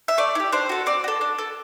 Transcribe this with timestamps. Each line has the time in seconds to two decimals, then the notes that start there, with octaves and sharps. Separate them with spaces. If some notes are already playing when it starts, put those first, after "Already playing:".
0.08 E5
0.18 A3 D5
0.35 E4
0.40 G4
0.52 D4 C5
0.69 F#4 A4
0.86 C4 D5
1.04 F#4
1.08 A4
1.21 D4
1.38 A4